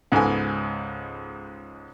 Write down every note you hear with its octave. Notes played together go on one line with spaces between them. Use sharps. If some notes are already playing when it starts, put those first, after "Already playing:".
C#2 G#2 B3 A4 G#5